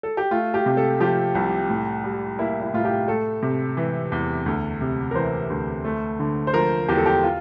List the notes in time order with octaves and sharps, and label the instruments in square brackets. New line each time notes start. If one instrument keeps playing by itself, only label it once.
[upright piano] A4
G4
A3 F4
G4
C3
A4
F3 G4
C2
A2
G3
A#3 E4
E4
A2 F4
G4
A3 A4
C3
E3
E2
D2
C3
A#4
E3 C5
D2
A3
D3
C5
F3 A#4
E2 G4
A4
G4
F4